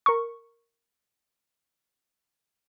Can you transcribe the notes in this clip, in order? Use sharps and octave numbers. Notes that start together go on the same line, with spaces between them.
A#4 C#6